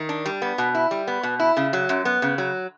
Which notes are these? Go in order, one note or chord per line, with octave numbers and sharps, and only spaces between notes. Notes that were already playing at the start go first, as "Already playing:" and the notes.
Already playing: D#3
D4
G3
B3
B2
E4
G3
B3
B2
E4
C#3
F#3
F#2
B3
C#3
F#3